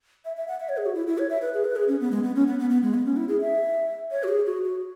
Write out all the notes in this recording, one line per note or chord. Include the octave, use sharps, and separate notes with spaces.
E5
E5
F#5
E5
C#5
G#4
F#4
E4
E4
C#5
E5
B4
G#4
B4
G#4
C#4
B3
G#3
B3
C#4
B3
B3
B3
G#3
B3
C#4
E4
G#4
E5
C#5
F#4
G#4
F#4
F#4